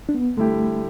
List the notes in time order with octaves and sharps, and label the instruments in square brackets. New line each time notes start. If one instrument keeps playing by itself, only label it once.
[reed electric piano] D4
B3
[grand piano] D3 G3 E4 G4 [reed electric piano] A3